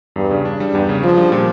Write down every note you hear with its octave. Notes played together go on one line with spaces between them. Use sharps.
E2 G2
C#3
D4
G3
E2 G2
C#3
F3 D4
G3
A#2